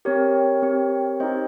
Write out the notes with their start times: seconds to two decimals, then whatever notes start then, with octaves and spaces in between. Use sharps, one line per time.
0.05 C4 G4 A#4 C#5
0.63 C4 G4
1.20 C4 D#4 G4 C5 D#5